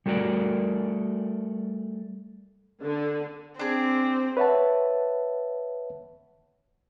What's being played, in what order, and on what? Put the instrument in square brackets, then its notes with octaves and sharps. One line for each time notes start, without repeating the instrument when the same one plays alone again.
[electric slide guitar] G3 A3 F#4 A#4 D5
[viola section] D3
[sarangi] C4 [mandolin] D4 G#4
[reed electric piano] B4 C#5 E5 F#5 A5